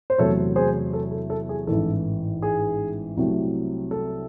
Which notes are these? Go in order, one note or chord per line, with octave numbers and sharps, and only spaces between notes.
C5
E2 C3 F#3 A3 A4 C#5
G#4 C5
A4
A4
A4
G#4
A1 G#2 E3 A4
G#4
C2 C3 F#3 A3
A4